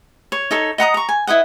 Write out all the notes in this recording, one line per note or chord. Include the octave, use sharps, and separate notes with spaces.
C#5
D#4 A4 C#5
D#5 F#5 A#5 D#6
A#5 C#6
G#5
E4 B4 D#5 F#5